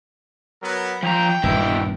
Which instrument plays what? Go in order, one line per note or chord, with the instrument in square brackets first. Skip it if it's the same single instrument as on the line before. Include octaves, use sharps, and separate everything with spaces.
[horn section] F#3 B3 A#4
[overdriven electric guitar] F3 A#5 [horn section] G5
[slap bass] D#1 G2 B3 [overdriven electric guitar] B2 E4